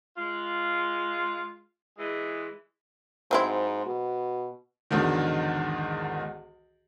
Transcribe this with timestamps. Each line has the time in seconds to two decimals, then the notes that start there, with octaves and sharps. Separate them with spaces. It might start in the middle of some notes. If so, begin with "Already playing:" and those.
0.18 G#3 F4
1.98 E3 G#3
3.31 G#2 F#3 C4 E4
3.86 B2
4.91 B1 E2 G#2 D3 D#3